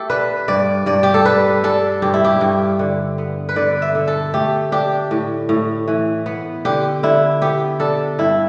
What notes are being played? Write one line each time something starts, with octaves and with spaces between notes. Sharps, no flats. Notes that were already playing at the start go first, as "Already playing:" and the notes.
Already playing: A3 G4 A4
D4 B4
G2 D5
G2 D5
G4
A4
G3 B4
D4 A4
G2 G4
E4
G4
G2
D3
B3
B4
D3 D5
E5
D3
A4
A3 G4
D4 G4
A2
A2
E3
B3
D3 G4
D3 E4
B3 G4
D4 A4
G2 E4